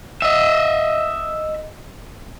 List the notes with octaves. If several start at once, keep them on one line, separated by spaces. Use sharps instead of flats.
D#5 E5